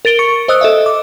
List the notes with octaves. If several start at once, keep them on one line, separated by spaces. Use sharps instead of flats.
A#4 A6 D7 G7
C#6 C#7
C5 D#5 D#6 E6 F#6
A4 D#5 E5
D6